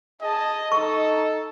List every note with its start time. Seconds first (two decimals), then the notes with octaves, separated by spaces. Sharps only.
0.22 G#4 D#5 A5
0.72 D#4 A4 D#5 C#6